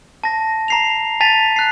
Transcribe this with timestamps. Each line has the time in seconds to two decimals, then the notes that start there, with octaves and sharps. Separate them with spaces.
0.24 A5 A#6
0.68 A#5 C7 F7
1.21 G#5 A5 A6 B6 D#7 F7
1.56 F#6 C7